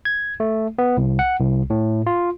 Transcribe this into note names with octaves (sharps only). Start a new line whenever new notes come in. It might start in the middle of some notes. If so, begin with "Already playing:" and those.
G#6
A3
B3
C2
F#5
C2
A2
F4